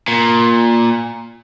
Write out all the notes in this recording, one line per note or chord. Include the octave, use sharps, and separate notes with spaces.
A#2